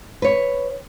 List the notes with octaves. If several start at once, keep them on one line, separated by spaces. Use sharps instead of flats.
B4 C#5